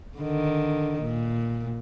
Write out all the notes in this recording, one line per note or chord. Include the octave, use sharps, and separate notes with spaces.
D3 D#3
A#2